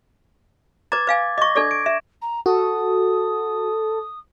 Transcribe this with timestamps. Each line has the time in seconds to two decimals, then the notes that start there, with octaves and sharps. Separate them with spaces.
0.92 B4 A#5 D6 G#6 A6
1.07 B4 F5 G#5
1.38 D#5 C#6 D6 A#6
1.56 D4 A4 D5 C#6 G#6
1.71 D7
1.86 E5 E7
2.21 A#5
2.46 F#4 A4 D#6